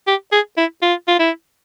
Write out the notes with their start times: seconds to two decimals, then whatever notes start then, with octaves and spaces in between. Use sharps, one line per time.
0.07 G4
0.32 G#4
0.57 E4
0.82 F4
1.08 F4
1.19 E4